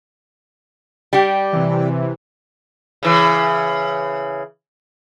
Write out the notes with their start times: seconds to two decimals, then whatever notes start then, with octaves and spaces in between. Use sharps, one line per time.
1.13 G3 G4
1.53 C3 E3
3.03 C#3 E3